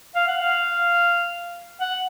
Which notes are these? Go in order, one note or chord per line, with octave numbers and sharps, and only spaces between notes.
F5
F#5
F5
F#5